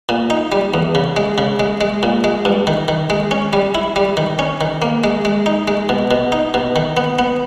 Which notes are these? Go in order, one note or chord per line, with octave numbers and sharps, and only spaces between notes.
A#2
D#4
G3
E2
C#3
G#3
C#3
G#3
G#3
A#2
G#3
G2
D#3
D#3
G#3
C#4
G3
E4
G3
D#3
C#4
D#3
A#3
G#3
G#3
D#4
G#3
B2
B2
D#4
B2
D#3
B3
B3